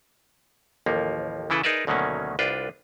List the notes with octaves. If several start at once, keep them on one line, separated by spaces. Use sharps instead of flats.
A1 D#2 F3 A#3
C#3 E3 E4 A4 B4
D#4 G#4 A#4 B4 D5 E5
D2 B2 D#3 F#3 A#3 C#4
C2 D4 F4 B4 G5